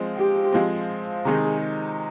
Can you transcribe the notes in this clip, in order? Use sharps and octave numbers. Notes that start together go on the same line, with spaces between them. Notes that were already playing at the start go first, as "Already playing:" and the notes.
Already playing: F3 G#3 C4
G4
F3 G#3 C4
C3 D#3 G#3 D#4 G#4